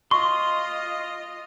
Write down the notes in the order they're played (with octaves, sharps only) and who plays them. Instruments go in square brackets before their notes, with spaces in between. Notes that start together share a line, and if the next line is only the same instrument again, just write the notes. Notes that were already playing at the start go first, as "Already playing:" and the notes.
[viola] F4 D#5 [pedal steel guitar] C6 [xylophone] C#6